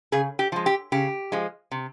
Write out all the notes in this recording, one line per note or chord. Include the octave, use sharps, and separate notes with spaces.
C#3 G#4
G4
F3 G#3
G4
C#3 G4
F3 G#3
C3